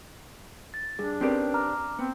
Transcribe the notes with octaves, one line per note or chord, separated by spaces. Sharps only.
A6
G2 D4 G#4
C4 C#4 G4 A#4 B4 D5
A#5 D6 F6
B3 C4